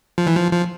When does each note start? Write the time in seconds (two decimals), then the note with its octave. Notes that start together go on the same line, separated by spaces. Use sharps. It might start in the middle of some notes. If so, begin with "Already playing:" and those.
0.18 F3
0.27 E3
0.36 F3
0.52 F3